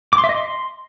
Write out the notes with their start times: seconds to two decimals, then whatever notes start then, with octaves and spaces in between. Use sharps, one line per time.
0.13 D6
0.18 C6
0.24 E5
0.29 D#5
0.35 C6